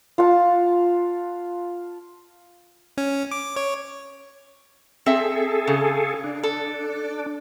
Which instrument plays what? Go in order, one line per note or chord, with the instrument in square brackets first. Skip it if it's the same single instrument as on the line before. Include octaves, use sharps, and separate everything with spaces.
[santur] F4 F#5 A5
[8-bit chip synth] C#4
D6
C#5
[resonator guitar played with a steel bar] C4 E5 [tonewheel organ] G#4 A4
[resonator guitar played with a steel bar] C#3
[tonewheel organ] D4
[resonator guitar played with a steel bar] A4